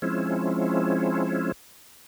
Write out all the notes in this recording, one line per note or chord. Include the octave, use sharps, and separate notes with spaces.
F3 G#3 C4 C#4 E4